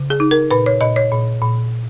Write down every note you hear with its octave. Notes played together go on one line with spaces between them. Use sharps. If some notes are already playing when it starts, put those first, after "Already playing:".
Already playing: C#3
G#4
D#4
A#4
A#2 B4
C#5
A#2 D#5
C#5
A#2
A#2